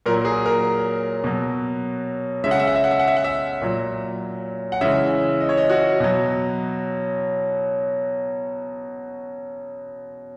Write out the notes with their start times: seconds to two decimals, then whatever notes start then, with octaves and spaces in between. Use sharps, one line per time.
0.06 A#2 F#3 A#4
0.25 G#4
0.46 A#4
1.24 B2 F#3
2.44 C#3 G#3 E5
2.51 F#5
2.60 E5
2.67 F#5
2.76 E5
2.84 F#5
2.91 E5
2.99 F#5
3.08 E5
3.17 F#5
3.24 E5
3.62 A#2 F#3
4.72 F#5
4.81 C#3 E3 G#3 E5
5.40 D#5
5.49 C#5
5.57 D#5
5.70 F#4
6.00 B2 F#3